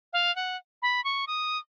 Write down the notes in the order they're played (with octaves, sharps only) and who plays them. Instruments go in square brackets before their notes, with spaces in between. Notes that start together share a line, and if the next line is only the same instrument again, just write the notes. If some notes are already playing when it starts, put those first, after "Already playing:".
[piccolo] F5
F#5
B5
C#6
D#6